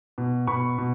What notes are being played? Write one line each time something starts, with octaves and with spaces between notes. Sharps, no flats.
B2
B2 B5 C#6
B2